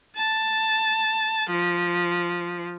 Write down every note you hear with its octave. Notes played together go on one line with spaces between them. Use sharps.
A5
F3